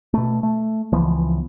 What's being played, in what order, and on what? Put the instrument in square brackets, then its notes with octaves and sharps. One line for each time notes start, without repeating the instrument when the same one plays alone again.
[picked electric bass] B2 A3
A3
C#2 E3 F3 B3